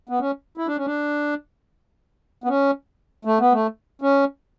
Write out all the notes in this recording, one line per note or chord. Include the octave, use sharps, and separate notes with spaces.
B3
C#4
E4
D4
C#4
D4
B3
C#4
A3
B3
A3
C#4